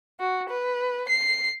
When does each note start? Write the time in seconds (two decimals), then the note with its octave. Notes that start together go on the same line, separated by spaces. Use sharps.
0.20 F#4
0.50 B4
1.09 C7